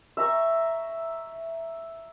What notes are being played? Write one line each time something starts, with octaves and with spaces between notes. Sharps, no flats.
E5 A#5 C#6